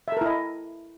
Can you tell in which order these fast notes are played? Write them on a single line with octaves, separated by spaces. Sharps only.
E5 A4 A#4 E4 D#5